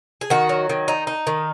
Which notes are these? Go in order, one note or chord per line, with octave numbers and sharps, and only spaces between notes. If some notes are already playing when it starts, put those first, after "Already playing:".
G#4
D#3 F#4
F#3
D#3
D#4
D#4
D#3